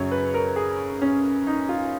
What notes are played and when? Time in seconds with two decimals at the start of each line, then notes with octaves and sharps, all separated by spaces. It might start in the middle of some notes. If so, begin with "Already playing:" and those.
Already playing: F#2 C#3 F#3 C#5
0.11 B4
0.34 A#4
0.56 G#4
1.02 C#4
1.47 D#4
1.69 F4